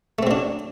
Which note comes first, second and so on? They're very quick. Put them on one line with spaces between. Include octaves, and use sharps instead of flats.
A3 C4 F#3 D4